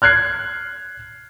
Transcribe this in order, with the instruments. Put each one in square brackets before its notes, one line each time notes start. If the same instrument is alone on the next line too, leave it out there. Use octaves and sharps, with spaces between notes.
[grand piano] F6 F#6 G#6 C7